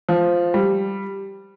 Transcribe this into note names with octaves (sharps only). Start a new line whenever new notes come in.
F3
G3